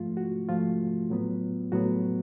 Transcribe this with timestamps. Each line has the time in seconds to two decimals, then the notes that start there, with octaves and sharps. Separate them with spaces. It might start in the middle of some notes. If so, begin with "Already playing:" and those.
Already playing: G#2 F3 A3 F4
0.17 F#4
0.49 G#2 F3 A3 F4
1.10 A2 F#3 B3
1.72 A2 F#3 B3 F#4